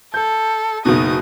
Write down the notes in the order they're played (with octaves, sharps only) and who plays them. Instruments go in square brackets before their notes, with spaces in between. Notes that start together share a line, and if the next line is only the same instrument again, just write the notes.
[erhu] A4 [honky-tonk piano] G6
[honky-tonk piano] F#1 B2 [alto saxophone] D#4 [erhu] D#6